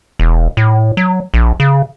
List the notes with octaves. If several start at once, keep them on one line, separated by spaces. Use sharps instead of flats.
E1
A2
F#3
A#1
C#3